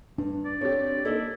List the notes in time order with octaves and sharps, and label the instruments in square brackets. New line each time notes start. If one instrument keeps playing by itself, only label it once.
[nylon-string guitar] G2 [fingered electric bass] D4
[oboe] D5
[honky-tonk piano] C4 G4 [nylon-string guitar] A4 C#5
[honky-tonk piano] A#3 D#4 [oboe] E4 [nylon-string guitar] A4 D5 D#5